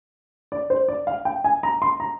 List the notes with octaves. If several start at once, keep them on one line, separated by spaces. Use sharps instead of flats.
D5
C5
D5
F5
G5
G#5
A#5
C6
A#5